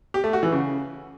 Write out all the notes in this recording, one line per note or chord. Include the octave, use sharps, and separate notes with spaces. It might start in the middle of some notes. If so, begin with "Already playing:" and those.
G4
A3
F#4
E3
C#3